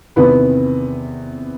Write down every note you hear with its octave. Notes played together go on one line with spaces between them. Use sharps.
E2 C3 D#3 B3 B4